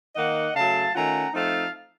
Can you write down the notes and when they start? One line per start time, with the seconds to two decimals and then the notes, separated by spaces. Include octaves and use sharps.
0.16 D#3 A#3 D#4 D#5 F#5
0.55 C#3 F#3 A3 F5 A5
0.94 D#3 A3 C#4 F4 F#5 A#5
1.34 F3 A3 C4 D#4 F5 A5